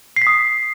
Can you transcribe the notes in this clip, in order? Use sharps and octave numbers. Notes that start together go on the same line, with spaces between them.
C7
B6
D#6